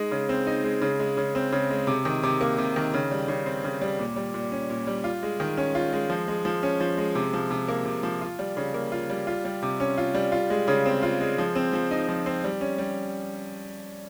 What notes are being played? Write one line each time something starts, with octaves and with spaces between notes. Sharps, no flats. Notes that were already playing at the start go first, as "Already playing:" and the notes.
Already playing: G#3 D#4
C#3
C4
D#4
G#3
C#3
G#3
C#3
C4
C#3
G#3
C3
D#3
C3
A#3
C3
D#3
C#3
G3
C#3
C4
C#3
G3
A#2
G3
A#2
C#4
A#2
G3
F4
G#3
D#3
C#4
F4
G#3
F3
G#3
F3
C#4
F3
G#3
C3
F3
C3
A#3
C3
F3
F4
G3
C#3
A#3
F4
G3
F4
G3
C3
C#4
F4
G3
F4
G#3
C#3
C4
F4
G#3
F3
C4
F3
D#4
F3
C4
G3
C#4
G3